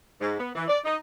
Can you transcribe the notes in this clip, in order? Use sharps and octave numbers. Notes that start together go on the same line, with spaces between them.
G#2
B3
E3
D5
D#4